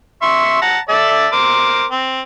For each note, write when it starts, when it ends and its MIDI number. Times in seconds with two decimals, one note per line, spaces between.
0.22 0.61 76
0.22 0.61 84
0.22 0.61 85
0.62 0.79 78
0.62 0.79 81
0.62 0.79 82
0.89 1.28 69
0.89 1.28 74
0.89 1.28 76
1.33 1.85 70
1.33 1.85 72
1.33 1.85 86
1.91 2.21 60